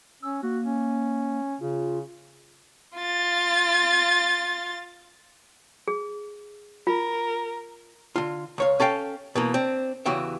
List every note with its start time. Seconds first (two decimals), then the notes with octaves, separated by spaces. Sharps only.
0.22 C#4 E6
0.43 A#3 F#4
0.64 C#4
1.60 C#3 F4
2.98 F4 A6
5.88 G#4
6.87 F4 A#4
8.16 D3 F4
8.58 C#2 C#5 F5
8.80 C#4 A4 F5 G5
9.35 B2 E3 A#3
9.54 C4 D4
10.06 E2 C#3 E3 F#4 G4 E5